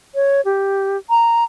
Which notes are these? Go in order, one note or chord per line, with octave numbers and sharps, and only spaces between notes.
C#5
G4
A#5